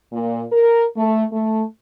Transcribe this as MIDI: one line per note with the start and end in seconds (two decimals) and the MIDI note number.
0.12 0.43 46
0.52 0.85 70
0.97 1.24 57
1.33 1.64 57